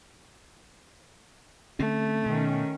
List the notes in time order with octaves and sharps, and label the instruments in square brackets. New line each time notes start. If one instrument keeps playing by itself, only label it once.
[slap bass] D3 C4 C#4 [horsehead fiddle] A3
[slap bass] B2 [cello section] D#3 C#4